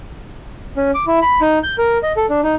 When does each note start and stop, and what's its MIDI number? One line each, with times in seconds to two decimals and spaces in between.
0.77 0.91 61
0.94 1.05 86
1.07 1.19 64
1.22 1.40 83
1.41 1.59 63
1.63 1.76 91
1.78 1.98 70
2.03 2.12 75
2.17 2.26 69
2.29 2.41 62
2.44 2.55 63